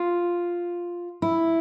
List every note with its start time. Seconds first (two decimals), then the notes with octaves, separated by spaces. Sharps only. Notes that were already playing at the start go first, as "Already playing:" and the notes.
Already playing: F4
1.22 E4